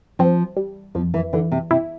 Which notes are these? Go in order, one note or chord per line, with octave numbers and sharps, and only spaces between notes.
F3 C4
G3
F2 F3
E3
D3 E3
C3
C3 E4